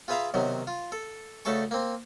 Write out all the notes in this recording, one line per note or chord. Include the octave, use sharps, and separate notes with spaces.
F4 G#4 B4 E5 F5 A#5
B1 C3 D#3 F#3
F4
A4
D2 C#3 A3 A4 A5 C#6
A#3 C4